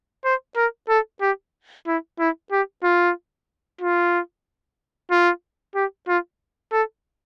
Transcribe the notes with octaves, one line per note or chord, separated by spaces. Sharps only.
C5
A#4
A4
G4
E4
E4
G4
F4
F4
F4
G4
F4
A4